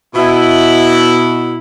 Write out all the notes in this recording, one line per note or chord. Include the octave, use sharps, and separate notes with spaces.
B2 E4